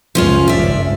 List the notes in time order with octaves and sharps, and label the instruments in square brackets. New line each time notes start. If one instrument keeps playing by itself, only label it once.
[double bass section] C#2 F#2 [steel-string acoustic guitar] F3 C#4 F4
[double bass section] G#1 C#2 G2 [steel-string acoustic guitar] D5 E5